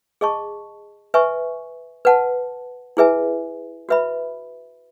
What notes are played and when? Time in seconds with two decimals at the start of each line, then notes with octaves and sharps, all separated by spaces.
0.21 G#4 D#5 A5 C#6
1.14 B4 E5 G#5 C#6
2.05 B4 F#5 A5
2.97 E4 G#4 B4 E5 G#5
3.89 F#4 B4 E5 B5